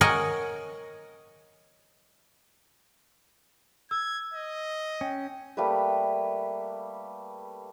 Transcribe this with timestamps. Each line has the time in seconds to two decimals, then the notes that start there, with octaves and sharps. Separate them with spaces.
0.01 A#4 C#5 D#5 F#5 G#5
3.91 E6 G#6
4.34 D#5
5.01 C#4 G5
5.57 G3 A3 A#3 B4